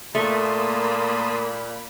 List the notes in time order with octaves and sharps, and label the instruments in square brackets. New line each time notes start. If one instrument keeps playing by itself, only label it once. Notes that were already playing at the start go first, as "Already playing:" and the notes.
[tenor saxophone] A#2 [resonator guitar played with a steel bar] A3 [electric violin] A#3 B5 [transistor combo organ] A5 C6 D#6